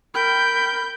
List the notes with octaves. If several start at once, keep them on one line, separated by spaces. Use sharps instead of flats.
A#4 G5 B5 G6